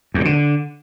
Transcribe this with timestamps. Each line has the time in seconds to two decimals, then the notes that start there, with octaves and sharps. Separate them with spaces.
0.14 E2
0.20 A2
0.25 D3